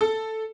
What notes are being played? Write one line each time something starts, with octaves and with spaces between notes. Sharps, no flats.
A4